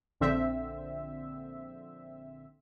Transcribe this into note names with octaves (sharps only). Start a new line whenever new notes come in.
A#1 D3 C4 E5